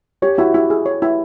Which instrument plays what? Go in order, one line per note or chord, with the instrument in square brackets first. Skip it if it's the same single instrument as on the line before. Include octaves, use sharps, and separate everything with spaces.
[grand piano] G4 [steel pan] C#5
[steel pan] E4 [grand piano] F#4
[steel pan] E4 [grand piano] G4
[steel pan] G#4
C#5
E4